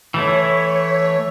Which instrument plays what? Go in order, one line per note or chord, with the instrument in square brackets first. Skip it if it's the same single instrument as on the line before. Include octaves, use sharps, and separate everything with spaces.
[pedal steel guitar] E3 A3 E4 [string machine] C#5